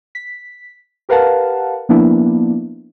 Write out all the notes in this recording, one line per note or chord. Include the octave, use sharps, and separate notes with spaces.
B6
G4 A#4 B4 F5 F#5 A5
F3 A#3 B3 D4 E4